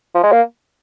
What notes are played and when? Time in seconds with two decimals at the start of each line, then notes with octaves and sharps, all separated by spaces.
0.15 F3
0.24 G#3
0.33 A#3